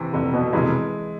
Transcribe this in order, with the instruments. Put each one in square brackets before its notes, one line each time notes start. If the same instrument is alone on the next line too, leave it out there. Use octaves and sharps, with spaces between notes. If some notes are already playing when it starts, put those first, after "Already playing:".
Already playing: [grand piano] C3 E3
[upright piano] F1 [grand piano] D3
[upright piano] B2
[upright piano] F1 [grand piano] E3 G#3